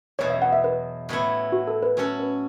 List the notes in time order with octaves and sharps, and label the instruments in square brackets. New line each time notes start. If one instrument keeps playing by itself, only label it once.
[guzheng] E2 B2 F#3 [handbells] C#5
[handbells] E5
F#5
E5
B4
[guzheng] A2 F#3 B3 E4
[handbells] F#4
A4
B4
[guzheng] F#3 C#4 F#4 A4 [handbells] B4
[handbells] B4